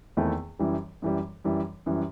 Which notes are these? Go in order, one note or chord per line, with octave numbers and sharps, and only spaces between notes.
E2 D#3 A3 C4 E4
F#2 E3 G3
F#2 E3 G3
F#2 E3 G3
F#2 E3 G3